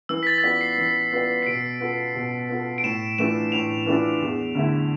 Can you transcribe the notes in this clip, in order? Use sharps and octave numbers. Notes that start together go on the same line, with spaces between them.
E3 E6
B6
A6
A6
B3 F4 B4 D5 B6
C7
E3
B3 F4 B4 D5
C7
B2 D7
B3 F4 A4
B2
B3 F4 A4
D7
A2 E7
E3 A3 D4 F4 E7
A2 F7
E3 A3 D4 F4
E2
D3 A3 E4